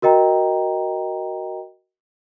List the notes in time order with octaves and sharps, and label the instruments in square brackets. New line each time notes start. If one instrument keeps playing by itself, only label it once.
[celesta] F#4 A#4 D#5 G5 A#5